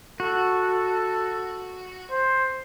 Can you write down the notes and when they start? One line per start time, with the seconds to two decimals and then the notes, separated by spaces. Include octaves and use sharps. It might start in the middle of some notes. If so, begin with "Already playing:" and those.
0.20 F#4 A4
2.11 C5